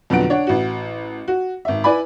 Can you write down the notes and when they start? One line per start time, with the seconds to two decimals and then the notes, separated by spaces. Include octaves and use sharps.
0.10 F2 B2 D3 F#3 F#5 D7
0.30 D4 C#5 F#5
0.47 A1 F#4
1.28 F#4
1.65 G#1 E5
1.84 E4 B4 D5 G#5 B5